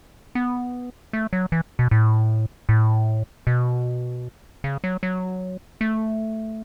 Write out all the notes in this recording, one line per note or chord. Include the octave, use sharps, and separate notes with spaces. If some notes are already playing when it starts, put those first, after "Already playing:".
B3
A3
F#3
E3
B2
A2
A2
B2
C#3
F#3
F#3
A3